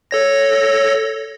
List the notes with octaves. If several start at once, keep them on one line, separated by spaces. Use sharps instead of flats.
A4 C#5 A#6